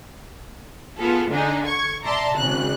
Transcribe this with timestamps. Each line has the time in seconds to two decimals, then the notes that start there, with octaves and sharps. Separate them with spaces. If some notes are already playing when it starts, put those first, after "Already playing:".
0.99 B3 F4 G#4 A4
1.30 D3 D4 D#4 G#4
1.66 C#6 G#6
2.05 D5 E5 A5 A#5 C6
2.37 G#1 C#3 F#6